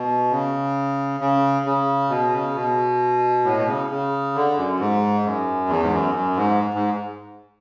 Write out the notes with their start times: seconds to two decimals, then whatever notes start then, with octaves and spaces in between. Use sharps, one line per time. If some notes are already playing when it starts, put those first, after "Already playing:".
Already playing: B2
0.31 C#3
1.20 C#3
1.65 C#3
2.10 B2
2.33 C#3
2.55 B2
3.45 A2
3.57 B2
3.67 C#3
3.90 C#3
4.35 D3
4.57 F#2
4.80 G#2
5.24 F#2
5.69 E2
5.83 G#2
5.92 F#2
6.15 F#2
6.36 G#2
6.74 G#2